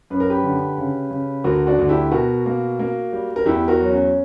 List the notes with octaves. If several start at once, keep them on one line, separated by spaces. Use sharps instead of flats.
F#2 B4
A#4
G4 B4
D3
C#3
C#3
D2 F#4 A#4
D4 F#4
D2
E4 G4
B2 F#4 A#4
A#3
A#3
G3
A#4
E2 E4 G4
F#4 A#4
F#3
C#4